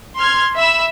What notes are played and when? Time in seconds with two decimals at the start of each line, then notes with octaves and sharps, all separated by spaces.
0.16 C6 F6 G#6
0.54 E5 B5 E6